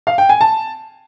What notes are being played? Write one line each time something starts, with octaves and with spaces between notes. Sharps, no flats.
F5
G5
G#5
A5